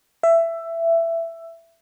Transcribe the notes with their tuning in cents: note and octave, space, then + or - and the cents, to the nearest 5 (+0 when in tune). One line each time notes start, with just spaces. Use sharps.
E5 +15